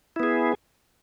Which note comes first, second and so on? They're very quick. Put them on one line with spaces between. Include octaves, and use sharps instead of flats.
E4 B3 G#4